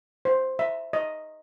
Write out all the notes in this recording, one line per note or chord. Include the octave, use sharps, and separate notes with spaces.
C5
E5
D#5